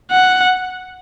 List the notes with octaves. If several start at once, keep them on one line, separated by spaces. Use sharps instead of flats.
F#5